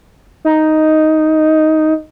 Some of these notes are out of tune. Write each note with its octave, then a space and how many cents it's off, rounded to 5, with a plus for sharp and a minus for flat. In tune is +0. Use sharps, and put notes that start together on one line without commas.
D#4 +5